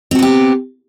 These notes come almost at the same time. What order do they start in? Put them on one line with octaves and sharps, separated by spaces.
C4 F#4 B3 G4